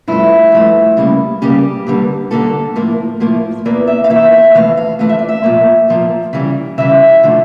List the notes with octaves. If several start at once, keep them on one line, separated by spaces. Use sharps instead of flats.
G2 F3 A3 E4
G2 F3 A3
C#3 G3 A#3
C#3 G3 A#3 G4
G2 D3 G3 A#3
G2 D3 G3 A#3 A4
A2 F3 A#3
A2 F3 A#3
E2 E3 A#3 D5
E5
F5
E2 E3 A#3 E5
E5
F2 E3 A3 F5
F5
F2 E3 A3 F5
E5
D5
E5
A#2 F3 A#3
A#2 F3 A#3
C#3 E3 G3
C#3 E3 G3 E5
D3 F3 A3